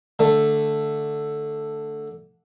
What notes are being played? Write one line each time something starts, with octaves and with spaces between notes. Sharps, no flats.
D3 A3